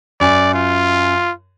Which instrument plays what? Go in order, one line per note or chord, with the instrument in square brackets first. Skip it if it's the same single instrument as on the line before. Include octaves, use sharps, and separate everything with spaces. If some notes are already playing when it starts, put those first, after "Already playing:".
[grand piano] F#2 G#5 [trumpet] D5
[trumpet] F4